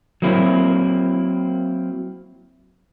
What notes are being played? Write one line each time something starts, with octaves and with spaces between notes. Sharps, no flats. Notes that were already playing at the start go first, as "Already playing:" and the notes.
F#3 A#3 C4 E4